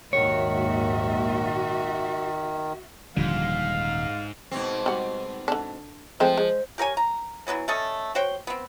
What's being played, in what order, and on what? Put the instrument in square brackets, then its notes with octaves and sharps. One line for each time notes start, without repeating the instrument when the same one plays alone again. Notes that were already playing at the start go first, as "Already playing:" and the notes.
[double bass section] A#1 D#2 G#2 [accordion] D#3 [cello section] F#4 E5 [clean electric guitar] C#5
[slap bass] D#1 G3 [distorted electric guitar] G#2 [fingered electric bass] D3 F3 [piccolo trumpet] F5
[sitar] G#2 B2 C4
[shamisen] G3 F#4
D3 D4
[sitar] F3 [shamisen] G#3 A3 C4 [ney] C5
[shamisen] G#3
[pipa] G4 A#4 C#5 G#5
A#5
E3 F#3 B3 C#4
A3 C#4 A4 D#5
F#4 C5 C#5 G5
B3 C4